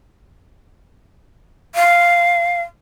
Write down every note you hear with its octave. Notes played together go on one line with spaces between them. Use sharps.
F5